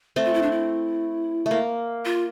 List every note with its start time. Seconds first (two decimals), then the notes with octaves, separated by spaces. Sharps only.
0.16 A3 C4
0.25 F4
0.34 E4
0.42 D4
0.52 E4
1.46 A3
1.51 A#3
2.05 F4